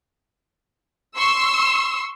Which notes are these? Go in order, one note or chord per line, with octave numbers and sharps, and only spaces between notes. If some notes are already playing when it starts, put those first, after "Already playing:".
C6 C#6 E6